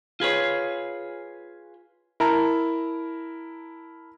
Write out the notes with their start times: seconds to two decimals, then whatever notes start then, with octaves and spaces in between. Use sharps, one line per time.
0.20 F4 G#4 B4 C#5
2.20 E4 A#4 A5 A#5